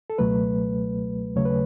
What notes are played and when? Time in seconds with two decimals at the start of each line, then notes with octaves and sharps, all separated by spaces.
0.10 A4
0.18 C#2 B2 F#3 A3 B4
1.36 D#2 C#3 F#3 A3 C#5
1.45 B4